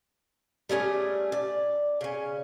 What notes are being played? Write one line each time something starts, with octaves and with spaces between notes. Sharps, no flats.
G3 A3 C#4 G#4
D5
C#3 C#4